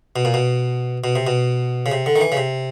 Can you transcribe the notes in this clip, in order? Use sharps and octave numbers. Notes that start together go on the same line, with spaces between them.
B2
A#2
B2
B2
C3
B2
C#3
C3
D3
D#3
E3
C#3
C3